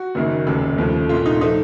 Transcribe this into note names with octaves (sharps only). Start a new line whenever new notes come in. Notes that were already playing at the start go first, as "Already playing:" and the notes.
Already playing: F#4
F#1 F#2 D#3 A#3
F1 D#2 C#3 A3 A4
D#2 C#3 F3 A3
C2 A#2 A3 F4
D#4
F3 A3 D#4